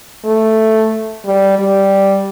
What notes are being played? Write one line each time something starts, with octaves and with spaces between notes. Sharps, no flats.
A3
G3
G3